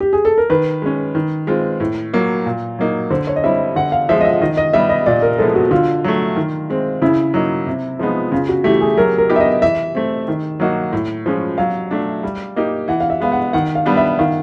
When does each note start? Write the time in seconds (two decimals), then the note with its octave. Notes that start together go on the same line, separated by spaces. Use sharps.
0.00 G4
0.13 G#4
0.25 A4
0.38 A#4
0.50 D#3 B4
0.82 G#3 C#4
1.15 D#3
1.47 G#3 C4 F4
1.80 A2
2.14 F#3 A#3
2.46 A#2
2.79 F#3 A#3 D#4
3.11 D3 C5
3.27 C#5
3.36 D#5
3.44 G3 C4 E4 E5
3.76 D3 F#5
3.92 F5
4.09 F3 G#3 E5
4.21 D#5
4.25 E5
4.41 D#3 D#5
4.57 D#5
4.73 G3 B3 E5
4.89 D#5
5.06 A#2 D5
5.22 A#4
5.38 F3 G#3 B3 E4 A4
5.55 F#4
5.71 D3 F4
6.04 F#3 A3
6.36 D#3
6.70 G#3 C4
7.02 C#3 E4
7.34 F#3 A#3 D#4
7.67 C3
7.99 F3 G#3 B3 D#4
8.32 C#3 F4
8.49 F#4
8.64 E3 A3 G4
8.81 G#4
8.97 F#3 A#4
9.18 A#4
9.29 B3 D#4 G4
9.36 E5
9.40 D#5
9.62 E3 E5
9.95 A3 C4
10.28 D#3
10.60 F#3 A#3 D#4 F#4
10.93 A2
11.26 F3 G#3 C#4
11.58 F#3 F5
11.91 A3 D4
12.23 G3
12.56 A#3 D#4 G4
12.88 E3 F#5
13.00 F5
13.10 E5
13.21 G#3 B3 F5
13.32 F#5
13.53 D#3 F#5
13.75 F5
13.86 G3 B3 D4
13.97 E5
14.19 D#3 F5